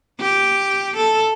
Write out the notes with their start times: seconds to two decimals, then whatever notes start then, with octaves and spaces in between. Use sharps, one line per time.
0.20 G4
0.97 A4